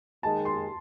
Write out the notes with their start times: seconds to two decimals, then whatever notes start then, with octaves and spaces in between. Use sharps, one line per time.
0.23 D#2 D#3 G#3 A5
0.45 C6